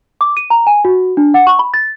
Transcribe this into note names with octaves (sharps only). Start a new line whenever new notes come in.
D6
D#7
A#5
G#5
F#4
D4
F#5
C#6
B5
A6